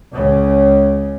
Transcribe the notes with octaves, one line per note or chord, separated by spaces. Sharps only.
C#2 C#3